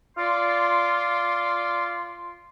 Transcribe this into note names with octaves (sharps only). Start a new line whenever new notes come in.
F4 D5 C6